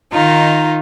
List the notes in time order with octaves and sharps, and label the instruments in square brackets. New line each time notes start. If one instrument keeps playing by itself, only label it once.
[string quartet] D#3 D#4 F4